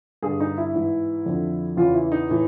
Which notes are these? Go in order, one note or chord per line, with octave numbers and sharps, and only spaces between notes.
G2 D3 G#4
D#4
E4
G#2 E3
F2 D3
E2 C#3 E3 F4
E4
D#4
A2 E3